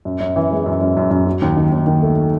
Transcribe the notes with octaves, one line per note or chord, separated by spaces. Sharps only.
F#2
F#2
E3
G#3
F#2
F#2
F#2
F#2
F#3
D#2
D#3
D#2
D#3
A3